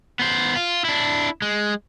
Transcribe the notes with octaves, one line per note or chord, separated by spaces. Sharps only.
B3 C5
F4
D4 E4
G#3